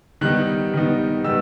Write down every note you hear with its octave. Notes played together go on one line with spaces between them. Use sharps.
D#3 G3 B3 D#4 F#6
D#3 G3 B3 D#4
D#3 G3 B3 D#4 E6